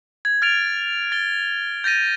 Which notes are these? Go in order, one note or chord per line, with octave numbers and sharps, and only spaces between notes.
G#6
F6 A6 D7 F7
A6 G7
G6 A6 A#6 D#7